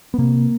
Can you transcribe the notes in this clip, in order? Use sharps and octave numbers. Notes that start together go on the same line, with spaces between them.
B3
C3 A#3